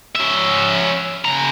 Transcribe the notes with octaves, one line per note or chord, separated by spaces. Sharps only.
C#4 E5
C#3 A#5